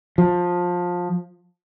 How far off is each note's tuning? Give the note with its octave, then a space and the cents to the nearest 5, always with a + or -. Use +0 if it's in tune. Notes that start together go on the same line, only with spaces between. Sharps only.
F3 +20